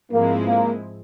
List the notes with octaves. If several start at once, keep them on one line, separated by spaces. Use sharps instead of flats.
G#2 F3 G#3 A#3 C4 E4
A#3